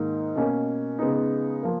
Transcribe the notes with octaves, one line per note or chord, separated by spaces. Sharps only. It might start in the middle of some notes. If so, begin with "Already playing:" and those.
Already playing: G#2 D#3 A#3 D#4
B2 A#3 C#4
C#3 G#3 B3 D#4
F3 A#3